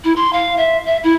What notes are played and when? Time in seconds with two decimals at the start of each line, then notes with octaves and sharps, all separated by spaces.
0.04 E4
0.15 C6
0.32 F5
0.57 E5
0.85 E5
1.03 E4